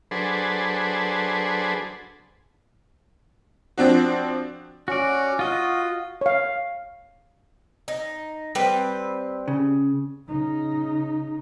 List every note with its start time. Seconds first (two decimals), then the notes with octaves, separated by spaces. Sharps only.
0.11 F#3 D4 G#4 A4 B4 C5
3.78 F3 C4 D4 F#4
4.88 C#4 F#4 D5
5.39 F4 F#4 D#5
6.21 C#5 F5
7.88 D#4
8.55 G3 C4 B4
9.48 C#3
10.27 C#3 D#4